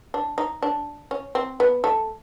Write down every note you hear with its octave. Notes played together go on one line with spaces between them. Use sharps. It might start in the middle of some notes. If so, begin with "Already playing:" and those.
D4
D#4
D4
C#4
C4
B3
A3